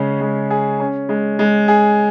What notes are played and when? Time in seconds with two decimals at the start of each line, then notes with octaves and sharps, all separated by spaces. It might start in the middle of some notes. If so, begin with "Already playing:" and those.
Already playing: C#3 G#3 C#4
0.21 G#3
0.50 G#4
0.80 C#4
1.09 G#3
1.39 G#3
1.68 G#4